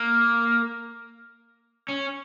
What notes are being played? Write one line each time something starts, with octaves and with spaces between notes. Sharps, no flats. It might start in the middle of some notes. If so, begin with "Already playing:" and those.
Already playing: A#3
C#4